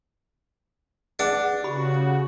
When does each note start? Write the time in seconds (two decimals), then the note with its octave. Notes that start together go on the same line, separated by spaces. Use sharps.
1.19 D4 G#4 B4 F#5
1.64 C#3 F#4 G4 B5